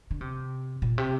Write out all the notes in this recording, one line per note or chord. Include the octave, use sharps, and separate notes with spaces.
D3
C3
A#2
C3